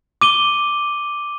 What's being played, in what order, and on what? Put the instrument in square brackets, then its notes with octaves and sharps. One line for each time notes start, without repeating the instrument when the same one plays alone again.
[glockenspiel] D6 D#7 G7